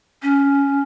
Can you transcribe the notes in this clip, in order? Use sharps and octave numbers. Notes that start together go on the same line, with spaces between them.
C#4